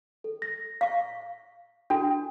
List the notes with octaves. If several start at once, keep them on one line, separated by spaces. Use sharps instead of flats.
A4
A#6
F5 C#6
D4 F#4 A4 G5